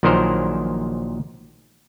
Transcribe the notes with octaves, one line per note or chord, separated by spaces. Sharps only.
A#1 A#2 D#3 F#3 A#4 C5